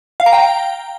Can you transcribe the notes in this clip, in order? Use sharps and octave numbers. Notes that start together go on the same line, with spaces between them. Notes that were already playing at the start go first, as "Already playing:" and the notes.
F5
A#5
G5